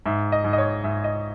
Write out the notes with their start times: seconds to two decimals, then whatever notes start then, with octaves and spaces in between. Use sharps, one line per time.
0.06 G#2 E5
0.32 D#5
0.44 G#2
0.53 D#5
0.58 C#5
0.84 G#2 E5
1.04 D#5